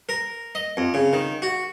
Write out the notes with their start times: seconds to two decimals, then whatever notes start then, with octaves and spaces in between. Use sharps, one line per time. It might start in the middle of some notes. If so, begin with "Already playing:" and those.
0.09 A#4
0.55 D#5
0.77 F2
0.94 C#3
1.13 D#3
1.42 F#4